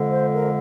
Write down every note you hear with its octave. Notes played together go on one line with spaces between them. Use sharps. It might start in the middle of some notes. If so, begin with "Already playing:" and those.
Already playing: F2 D3 G#3
C5
A#4